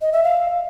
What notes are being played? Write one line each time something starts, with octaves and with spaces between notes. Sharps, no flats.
D#5
E5
F5